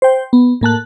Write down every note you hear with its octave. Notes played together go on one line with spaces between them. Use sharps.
C5 G5
B3
A2 A#3 A5 F#6